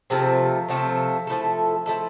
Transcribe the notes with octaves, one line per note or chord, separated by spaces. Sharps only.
C3 F3 A3 C4
C3 F3 A3 C4
F3 A3 E4 A4
F3 A3 E4 A4